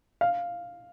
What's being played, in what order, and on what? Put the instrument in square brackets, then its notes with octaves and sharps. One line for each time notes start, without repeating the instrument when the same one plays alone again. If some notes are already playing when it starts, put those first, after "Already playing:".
[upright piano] F5